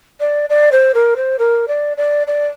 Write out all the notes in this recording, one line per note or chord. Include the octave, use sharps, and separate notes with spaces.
D5
D5
C5
A#4
C5
A#4
D5
D5
D5